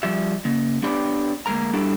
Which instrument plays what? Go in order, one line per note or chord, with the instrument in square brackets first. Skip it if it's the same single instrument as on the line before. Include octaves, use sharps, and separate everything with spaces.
[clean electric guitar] F3 G3 E5
C#3 A#3
B3 D4 G4 B4 C#5 D5
D2 G#3 A#3 A#4 A#5
G3 D4 E4 F#4 G4 A4